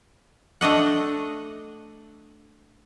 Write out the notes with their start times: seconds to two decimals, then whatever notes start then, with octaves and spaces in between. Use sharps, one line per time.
0.61 A3 D4 D#5 F#5